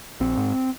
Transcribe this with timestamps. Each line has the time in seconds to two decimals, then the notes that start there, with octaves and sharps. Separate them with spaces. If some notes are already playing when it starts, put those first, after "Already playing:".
0.20 A#1 C4
0.37 G#2